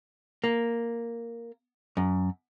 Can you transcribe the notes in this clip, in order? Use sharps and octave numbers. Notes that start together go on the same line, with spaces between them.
A#3
F#2